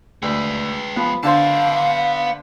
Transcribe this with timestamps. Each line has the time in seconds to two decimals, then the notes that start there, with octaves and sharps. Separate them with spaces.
0.22 D2 G#3 B4
0.96 F3 B3
1.23 D3 B3 C5 F5 A5